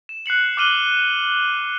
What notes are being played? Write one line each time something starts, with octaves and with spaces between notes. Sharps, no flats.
E7
F#6 C7 C#7 F#7
D6 F6 F#6 D#7 F#7 G7